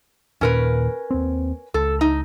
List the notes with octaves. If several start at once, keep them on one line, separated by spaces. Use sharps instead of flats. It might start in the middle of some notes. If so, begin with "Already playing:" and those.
D#2 A#2 C#4 A#4 B4
D#2 C4
C#2 A4
D#4